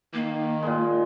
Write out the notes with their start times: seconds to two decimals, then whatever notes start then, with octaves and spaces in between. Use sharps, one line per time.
0.14 D#3 A#3
0.63 A#2 G#3